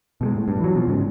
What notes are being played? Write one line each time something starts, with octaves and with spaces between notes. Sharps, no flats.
B2 G3 G#3
A2
G2
E3 F#3
B2 F3
G#2 C#3